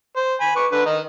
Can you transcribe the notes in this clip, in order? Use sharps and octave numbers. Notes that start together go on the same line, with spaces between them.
C5
G#5 B5
B4 C#6 D6
D3 B4
D#3 D#4